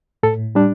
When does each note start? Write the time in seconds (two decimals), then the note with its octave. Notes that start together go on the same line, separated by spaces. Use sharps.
0.23 A2 A4
0.55 G3 D4